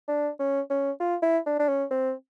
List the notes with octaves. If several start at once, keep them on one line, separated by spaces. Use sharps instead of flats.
D4
C#4
C#4
F4
E4
D4
D4
C#4
C4